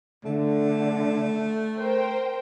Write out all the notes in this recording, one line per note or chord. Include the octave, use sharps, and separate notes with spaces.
D3 A3
A#4 C5 G5